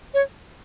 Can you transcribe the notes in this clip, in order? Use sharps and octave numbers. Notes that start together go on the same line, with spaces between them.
C#5